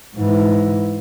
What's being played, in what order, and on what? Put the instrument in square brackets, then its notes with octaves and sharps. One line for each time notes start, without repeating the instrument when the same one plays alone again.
[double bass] G#2 E3